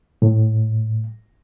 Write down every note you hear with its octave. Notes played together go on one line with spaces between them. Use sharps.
A2